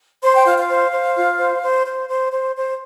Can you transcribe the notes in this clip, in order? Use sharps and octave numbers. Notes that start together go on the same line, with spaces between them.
C5 C6
G5
F4 F5
F5
C5
C5
F4
C5
C5
C5
C5
C5
C5